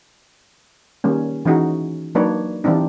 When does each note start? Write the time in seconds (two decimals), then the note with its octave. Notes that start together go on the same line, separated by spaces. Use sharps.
1.04 D#3 G3 A#3 C#4
1.45 E3 C#4 D#4 F#4 G#4
2.15 F#3 A#3 D4 D#4 B4 C#5
2.64 E3 G3 C4 D4 D#4